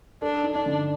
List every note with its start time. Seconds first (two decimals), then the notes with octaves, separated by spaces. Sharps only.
0.22 D4 A4
0.43 D#4
0.55 D4
0.66 D3